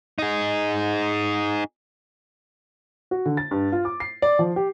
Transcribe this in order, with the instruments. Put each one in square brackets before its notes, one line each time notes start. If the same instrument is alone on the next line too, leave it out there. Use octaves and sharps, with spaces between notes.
[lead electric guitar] D#4 G#4
[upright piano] F#4
D3
A6
G2
F4
D6
C7
D5
F3
G4